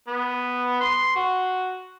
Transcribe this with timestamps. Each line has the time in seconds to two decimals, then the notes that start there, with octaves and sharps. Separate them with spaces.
0.07 B3
0.80 C6
1.16 F#4